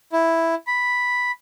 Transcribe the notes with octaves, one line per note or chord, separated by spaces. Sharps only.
E4
B5